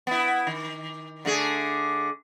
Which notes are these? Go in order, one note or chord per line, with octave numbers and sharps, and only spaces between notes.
B3 E4
D#3
D3 A3 G#4